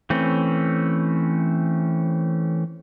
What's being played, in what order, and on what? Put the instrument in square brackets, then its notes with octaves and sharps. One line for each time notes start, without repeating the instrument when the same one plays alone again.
[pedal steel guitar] E3 A3 C4 C#4